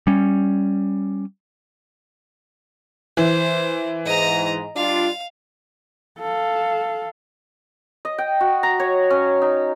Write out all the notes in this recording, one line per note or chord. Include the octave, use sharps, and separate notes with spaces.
G3 C#4
E3 C5
G#2 D#5 A#5
G3 D4 F4 F5
A4 F5
D#5
G5
F#4
A#5
C#5
C#4
D#4